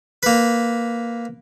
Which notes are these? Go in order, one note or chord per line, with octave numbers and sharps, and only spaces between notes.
A#3 B4